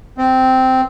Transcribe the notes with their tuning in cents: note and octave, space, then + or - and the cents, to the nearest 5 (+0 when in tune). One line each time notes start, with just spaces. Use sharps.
C4 -10